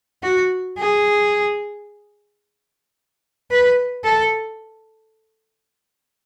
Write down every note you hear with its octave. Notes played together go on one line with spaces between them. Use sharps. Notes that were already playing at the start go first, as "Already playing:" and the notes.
F#4
G#4
B4
A4